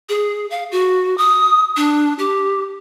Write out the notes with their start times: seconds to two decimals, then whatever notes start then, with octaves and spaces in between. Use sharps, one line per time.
0.09 G#4
0.50 F5
0.72 F#4
1.18 D#6
1.76 D4
2.19 G4